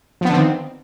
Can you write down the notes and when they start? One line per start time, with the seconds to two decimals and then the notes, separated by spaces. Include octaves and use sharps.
0.21 F3
0.25 B3
0.29 D3
0.33 C4
0.37 D#3